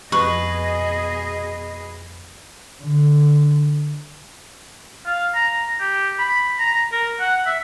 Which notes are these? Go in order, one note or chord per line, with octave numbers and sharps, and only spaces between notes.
F2 B2 G#4 B4 D#5 C#6
D3
F5
A#5
G4
B5
A#5
A#4
F#5
E5